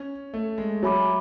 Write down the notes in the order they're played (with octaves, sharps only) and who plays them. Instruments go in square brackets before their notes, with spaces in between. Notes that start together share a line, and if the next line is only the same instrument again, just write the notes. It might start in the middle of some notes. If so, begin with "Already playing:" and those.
Already playing: [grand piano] C#4
A3
G#3
[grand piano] F#3 [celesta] C#5 E5 G#5 B5 D6